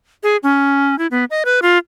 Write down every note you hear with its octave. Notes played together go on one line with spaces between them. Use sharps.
G#4
C#4
E4
B3
D#5
B4
F4